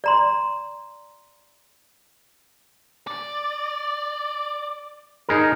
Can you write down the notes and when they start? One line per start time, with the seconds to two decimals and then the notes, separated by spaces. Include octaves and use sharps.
0.04 D5 A#5 C6
3.07 D5
5.29 D#4 G#4 A#4